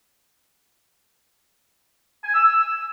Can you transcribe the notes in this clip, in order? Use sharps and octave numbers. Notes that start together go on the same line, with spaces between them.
G#5
E6
E6